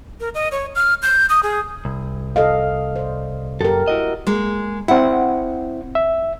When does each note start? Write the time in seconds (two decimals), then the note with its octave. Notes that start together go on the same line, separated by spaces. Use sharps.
0.20 A#4
0.34 D#5
0.52 C#5
0.75 F6
1.02 G6
1.29 D#6
1.43 G#4
1.85 C2
2.36 A4 D#5 F5
2.96 C5 D5
3.61 F#2 G4 A4 A#4
3.88 E4 F#4 D#5
4.27 G#3 A#3
4.88 C4 E4 F#5
5.95 E5